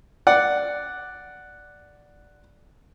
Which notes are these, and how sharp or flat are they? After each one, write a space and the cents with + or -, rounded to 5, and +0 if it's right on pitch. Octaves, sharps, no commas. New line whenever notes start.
D5 +0 F#5 +0